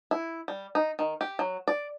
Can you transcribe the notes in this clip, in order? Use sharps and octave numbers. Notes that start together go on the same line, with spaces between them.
E4
G3
D#4
D#3
G4
F#3
D5